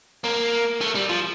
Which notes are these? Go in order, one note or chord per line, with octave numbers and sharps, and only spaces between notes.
A#3
A3
G3
F3